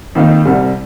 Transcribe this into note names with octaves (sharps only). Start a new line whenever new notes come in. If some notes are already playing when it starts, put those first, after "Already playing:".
F2 D#3 A#3 D#4
C2 C3 G3